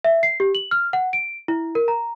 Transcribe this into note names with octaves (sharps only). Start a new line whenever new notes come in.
E5
C7
G4
F#7
F6
F#5
D7
E4
A#4
A#5